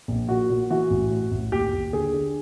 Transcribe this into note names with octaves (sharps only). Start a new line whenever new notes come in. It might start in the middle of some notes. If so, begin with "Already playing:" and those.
A#1
A#2 F#4
A#2
E3 F#4
A1
A2
A1
D#2 G4
D#2
D3 G#4
D3